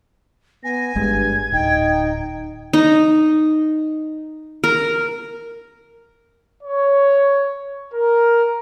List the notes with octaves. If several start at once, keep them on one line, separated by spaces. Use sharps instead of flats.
B3 G#5 A#6
G#1 G2 G#3 G#6
D1 D#4 G5
D#4
A#4
C#5
A#4